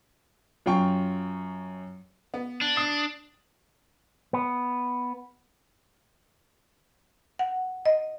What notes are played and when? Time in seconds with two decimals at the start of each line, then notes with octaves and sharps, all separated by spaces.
0.66 F#2 F4 G5 C#6
2.34 B3
2.61 D4
2.76 D#6 C7
4.33 B3
7.39 F#5
7.86 D#5